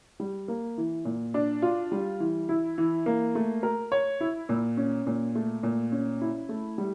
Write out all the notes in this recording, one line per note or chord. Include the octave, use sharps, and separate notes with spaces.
G3
A#3
E3
A#2
D4
F4
G3
E3
E4
E3
A#3
A3
A#4
C#5
E4
A#2
C#4
A#2
A3
A#2
C#4
E4
A3
G3